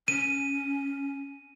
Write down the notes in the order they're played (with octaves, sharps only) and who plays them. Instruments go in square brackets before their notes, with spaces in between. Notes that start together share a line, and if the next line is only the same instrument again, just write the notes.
[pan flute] C#4 [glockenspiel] D#7